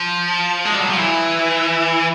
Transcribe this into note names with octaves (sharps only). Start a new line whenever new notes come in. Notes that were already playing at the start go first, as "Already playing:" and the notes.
Already playing: F3
G#3
G3
F#3
F3
E3